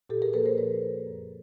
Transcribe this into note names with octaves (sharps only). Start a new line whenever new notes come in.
A#2 G4 A4
G#4 A#4
F3 A#3 A4 B4
A#4 C5
A#2 B4 C#5
F3 A#3
F#2